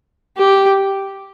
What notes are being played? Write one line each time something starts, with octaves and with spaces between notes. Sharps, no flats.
G4